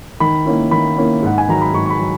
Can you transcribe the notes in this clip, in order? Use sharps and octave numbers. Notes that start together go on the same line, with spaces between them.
D#3 B5
A#3 C#4 E4
D#3 B5
A#3 C#4 E4
G#2 F#5
G#5
D#3 F#3 A#5
B5
G#2 C#6
C#6
B5
F#3